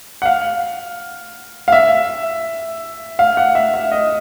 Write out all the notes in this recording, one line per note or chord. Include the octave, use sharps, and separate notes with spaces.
F#5
F5
F5
E5
F5
F#5
E5
E5
D#5